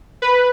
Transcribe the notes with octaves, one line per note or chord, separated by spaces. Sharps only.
B4